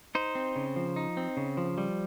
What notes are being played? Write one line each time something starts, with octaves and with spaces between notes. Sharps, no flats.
D#4 C5
C4
C#3
F3
D#4
C4
C#3
F3
G3